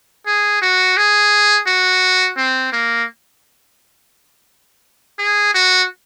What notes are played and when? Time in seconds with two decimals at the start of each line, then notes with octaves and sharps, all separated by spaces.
0.26 G#4
0.62 F#4
0.97 G#4
1.67 F#4
2.37 C4
2.72 A#3
5.19 G#4
5.54 F#4